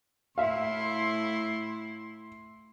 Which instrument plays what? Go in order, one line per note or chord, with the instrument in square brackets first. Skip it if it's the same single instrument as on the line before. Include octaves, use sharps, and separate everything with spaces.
[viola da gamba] A2 E4 [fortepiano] E5 F5 [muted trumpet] C6